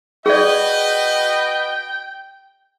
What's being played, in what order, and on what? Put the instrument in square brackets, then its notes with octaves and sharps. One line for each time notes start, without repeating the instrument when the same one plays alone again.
[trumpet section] F#4 B4 D#5 [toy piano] G#4 D5 [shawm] G5